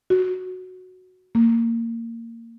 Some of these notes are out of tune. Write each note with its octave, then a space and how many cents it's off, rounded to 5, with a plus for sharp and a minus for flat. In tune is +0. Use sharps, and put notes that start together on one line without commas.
F#4 -5
A#3 -20